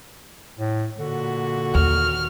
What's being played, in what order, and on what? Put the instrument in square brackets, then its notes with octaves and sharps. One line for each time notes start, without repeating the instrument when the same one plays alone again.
[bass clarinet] A2
[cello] A#2 F#4 [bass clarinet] D3
[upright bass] D#2 [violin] F6